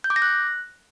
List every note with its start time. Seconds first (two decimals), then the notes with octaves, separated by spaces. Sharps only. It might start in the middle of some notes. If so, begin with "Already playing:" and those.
0.04 G6
0.10 D6
0.16 A#6
0.22 F#6